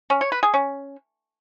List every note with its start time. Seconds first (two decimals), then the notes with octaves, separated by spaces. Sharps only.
0.10 C#4
0.21 C#5
0.32 B4
0.43 G#4
0.54 C#4